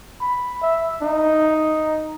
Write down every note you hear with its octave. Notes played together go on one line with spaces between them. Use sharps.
B5
E5
D#4